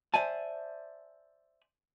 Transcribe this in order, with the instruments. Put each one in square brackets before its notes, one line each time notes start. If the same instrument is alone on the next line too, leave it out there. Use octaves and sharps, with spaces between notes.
[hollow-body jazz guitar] C5 D5 E5 G#5 A5